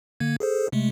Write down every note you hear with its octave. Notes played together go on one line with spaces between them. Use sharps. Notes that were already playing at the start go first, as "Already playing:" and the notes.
D3 A#3 G#6
G#4 A4 C5
C3 G#3 A3